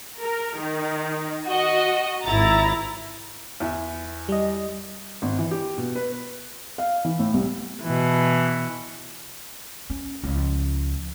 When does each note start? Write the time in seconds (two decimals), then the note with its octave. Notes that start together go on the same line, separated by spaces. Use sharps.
0.21 A#4
0.58 D#3
1.47 F#4 D#5
2.23 G#1 E4 A#5 A6
3.60 E2 E5
4.29 G3 D#5
5.22 G#1
5.39 E3
5.51 G4
5.77 B2
5.95 B4
6.78 F5
7.05 E3
7.19 A2
7.34 C2
7.83 B2 E3
9.90 C#4
10.24 C#2 F3